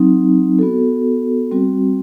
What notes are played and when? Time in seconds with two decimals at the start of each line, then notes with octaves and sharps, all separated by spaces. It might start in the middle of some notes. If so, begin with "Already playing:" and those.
Already playing: F#3 C4 D#4
0.59 B3 F#4 A4
1.51 G3 C4 F#4